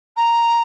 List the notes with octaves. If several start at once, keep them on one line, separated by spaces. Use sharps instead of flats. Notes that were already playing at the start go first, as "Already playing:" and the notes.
A#5